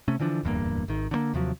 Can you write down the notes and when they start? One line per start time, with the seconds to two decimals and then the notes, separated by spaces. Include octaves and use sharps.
0.08 C3 A3 C#4
0.20 D3 E3 F3 D4
0.43 D1 E2 G2 A#3
0.88 G#1 D#3
1.11 D3 D#3 A#3
1.34 D#2 C3 F3 F#3